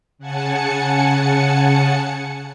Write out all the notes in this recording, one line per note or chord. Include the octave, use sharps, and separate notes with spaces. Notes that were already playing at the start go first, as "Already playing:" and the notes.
C#3 F#5 G#5 A5 C#7